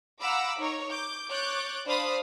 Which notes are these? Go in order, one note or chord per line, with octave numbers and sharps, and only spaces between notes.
F5 F#5 A#5 B5 D6 E6
D#4 A#4 C#5
D6 G6
C#5 D6 F#6 G6 A6
D4 C5 D5 F5 B5 D#6